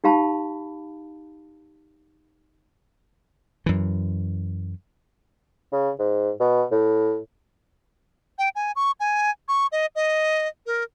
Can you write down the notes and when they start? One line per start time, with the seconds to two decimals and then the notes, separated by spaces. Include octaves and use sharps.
0.04 D#4 G4 F5 A5 B5
3.66 F#2 E3
5.72 C#3
5.99 G#2
6.40 B2
6.71 A2
8.38 G5
8.55 G#5
8.76 C#6
9.00 G#5
9.48 C#6
9.72 D#5
9.96 D#5
10.66 A#4